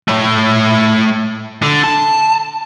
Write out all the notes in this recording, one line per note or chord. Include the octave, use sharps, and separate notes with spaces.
A3 C#5
D3
A5